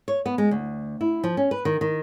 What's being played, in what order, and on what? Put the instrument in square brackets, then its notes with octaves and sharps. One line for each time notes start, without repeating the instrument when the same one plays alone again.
[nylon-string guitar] C#5
B3
G#3
D2
E4
F3
C#4
B4
D#3
D#3